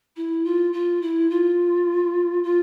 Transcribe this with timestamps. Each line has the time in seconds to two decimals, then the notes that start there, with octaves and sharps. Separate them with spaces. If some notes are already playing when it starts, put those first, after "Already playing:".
0.16 E4
0.44 F4
0.73 F4
1.01 E4
1.29 F4
2.43 F4